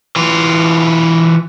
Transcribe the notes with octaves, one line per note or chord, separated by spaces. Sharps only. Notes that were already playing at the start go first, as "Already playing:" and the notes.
E3 F4